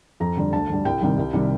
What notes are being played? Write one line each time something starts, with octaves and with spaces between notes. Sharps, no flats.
F2 A#5
D3 G3
D2 A5
D3 G3
C2 G5
C3 D#3 G3
C2
C3 D#3 G3